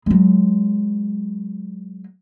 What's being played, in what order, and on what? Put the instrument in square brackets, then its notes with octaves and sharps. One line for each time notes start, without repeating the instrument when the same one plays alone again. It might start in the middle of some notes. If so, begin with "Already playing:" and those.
[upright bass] F#3 G#3